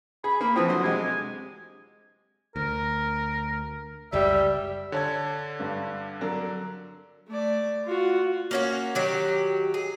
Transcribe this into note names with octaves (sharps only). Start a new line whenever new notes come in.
G#4 B5
A#3 B5
E3 F3 C4 D#6
D3 F#3 C5
C3 G#3 G#5
D2 A#4
F#1 C#2 G3 E5
D3 C#5 A5 G#6
G2
F#3 D4 A#4
A3 D5
F4 F#4
A#3 C#4 F#4
D#3 F#3 G4
G#4